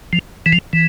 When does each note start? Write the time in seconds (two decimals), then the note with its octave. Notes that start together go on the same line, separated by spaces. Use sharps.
0.13 F3
0.46 E3
0.53 F3
0.73 E3